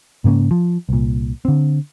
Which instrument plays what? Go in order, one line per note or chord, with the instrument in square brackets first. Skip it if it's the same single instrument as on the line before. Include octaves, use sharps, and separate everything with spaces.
[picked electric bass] G#2 C#3 A#3 C#4
F3
C2 A#2
D3 C4